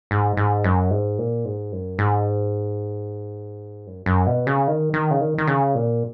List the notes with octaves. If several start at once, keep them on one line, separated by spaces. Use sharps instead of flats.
G#2
G#2
F#2
G#2
A#2
G#2
F#2
G#2
F#2
F#2
B2
C#3
D#3
D#3
C#3
D#3
D#3
C#3
A#2